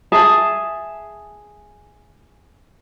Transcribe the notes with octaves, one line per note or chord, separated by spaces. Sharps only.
G#4 E5 A5